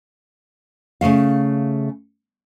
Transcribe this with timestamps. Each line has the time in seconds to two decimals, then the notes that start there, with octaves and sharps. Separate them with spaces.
1.01 C#3 F#3 A3 F5